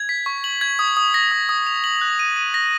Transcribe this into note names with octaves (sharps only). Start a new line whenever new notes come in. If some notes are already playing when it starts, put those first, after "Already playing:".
Already playing: G#6
B6
C#6
F#7
G#6
D#6
D#6
A#6
D#6
D#6
F7
F#7
F#6
D#7
D#7
A#6